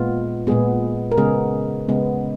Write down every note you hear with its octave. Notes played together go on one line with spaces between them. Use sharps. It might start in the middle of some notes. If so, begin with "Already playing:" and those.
Already playing: A#2 G#3 B3 F4
A#2 G#3 B3 G#4
A#4
C#3 G#3 B3 G#4
C#3 G#3 B3